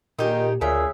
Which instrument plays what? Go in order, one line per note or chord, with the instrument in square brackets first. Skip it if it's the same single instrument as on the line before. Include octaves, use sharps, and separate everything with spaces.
[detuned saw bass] A#2 [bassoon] D#3 [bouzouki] D#4 G4 G#4
[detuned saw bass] D2 [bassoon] A#2 [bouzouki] C#3 E5 [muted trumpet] G#4